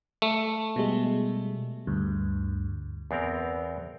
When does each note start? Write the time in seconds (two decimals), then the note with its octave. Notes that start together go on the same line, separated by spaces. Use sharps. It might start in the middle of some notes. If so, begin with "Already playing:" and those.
0.22 A3
0.76 B2 G3 G#3
1.87 D2 G2
3.11 E2 B3 C4 A#4